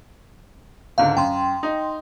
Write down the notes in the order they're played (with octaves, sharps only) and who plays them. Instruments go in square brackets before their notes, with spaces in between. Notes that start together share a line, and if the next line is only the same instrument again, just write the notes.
[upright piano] C#2 G#2 D3 [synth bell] F5
[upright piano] F#2 [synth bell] G5 C6
[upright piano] D#4